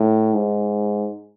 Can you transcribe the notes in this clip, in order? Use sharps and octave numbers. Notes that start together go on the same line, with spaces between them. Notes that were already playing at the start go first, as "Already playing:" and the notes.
Already playing: A2
G#2